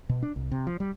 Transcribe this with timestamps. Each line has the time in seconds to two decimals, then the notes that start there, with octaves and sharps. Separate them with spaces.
0.09 B2
0.23 D4
0.36 C2
0.52 C3
0.67 F3
0.80 G3